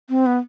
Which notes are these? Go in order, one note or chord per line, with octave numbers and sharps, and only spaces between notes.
C4
B3